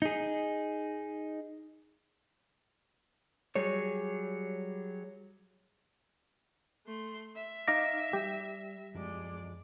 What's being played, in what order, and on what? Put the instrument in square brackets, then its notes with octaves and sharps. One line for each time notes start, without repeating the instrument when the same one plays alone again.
[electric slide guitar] D#4 G#4
F#3 G3 G#4 C#5
[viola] A3 C6
E5
[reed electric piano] D#4 F5 D6 [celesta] A#6
[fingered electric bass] G3 [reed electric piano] G4
[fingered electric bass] F#2 F3 [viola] G#3 D5